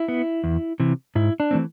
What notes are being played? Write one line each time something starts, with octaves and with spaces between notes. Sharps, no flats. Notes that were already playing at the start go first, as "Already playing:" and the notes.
Already playing: E4
B3
E2
C3 E3
G#2 E4
D4
E3 A3 C4